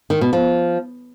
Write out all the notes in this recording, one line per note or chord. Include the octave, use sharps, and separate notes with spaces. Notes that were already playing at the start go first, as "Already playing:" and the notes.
D#3
B2
F3